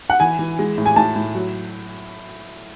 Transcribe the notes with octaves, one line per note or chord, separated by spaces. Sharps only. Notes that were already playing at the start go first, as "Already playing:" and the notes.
F#5
E3 G#5
E3
G#3
A2
G#5
A2 A5
A2
F#3